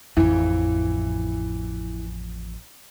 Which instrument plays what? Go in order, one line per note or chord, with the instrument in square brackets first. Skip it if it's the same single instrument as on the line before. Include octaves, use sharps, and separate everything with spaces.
[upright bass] A1 F2 [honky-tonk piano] E3